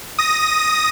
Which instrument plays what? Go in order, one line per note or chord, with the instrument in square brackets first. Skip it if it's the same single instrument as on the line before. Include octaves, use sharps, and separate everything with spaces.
[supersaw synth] D#6 A#6